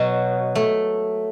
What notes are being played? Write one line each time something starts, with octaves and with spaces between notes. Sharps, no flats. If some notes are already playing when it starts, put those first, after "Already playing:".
Already playing: B2 F#3
A3